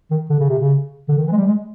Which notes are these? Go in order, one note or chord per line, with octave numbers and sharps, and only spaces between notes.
D#3
D3
C#3
C3
C#3
D3
D#3
E3
G#3
G3
G#3